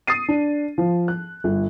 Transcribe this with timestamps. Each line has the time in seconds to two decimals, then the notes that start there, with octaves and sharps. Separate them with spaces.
0.07 D#6 A6 C7 D#7
0.28 D4
0.78 F3
1.08 F#6
1.44 G1